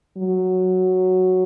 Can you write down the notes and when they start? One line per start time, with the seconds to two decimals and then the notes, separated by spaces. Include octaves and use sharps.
0.17 F#3